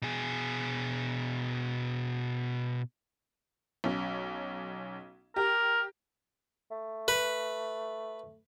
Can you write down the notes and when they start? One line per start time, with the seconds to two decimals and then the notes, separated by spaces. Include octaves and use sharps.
0.02 B2 G#4
3.84 B1 C#4
5.36 G4 A#4
6.71 A3
7.08 B4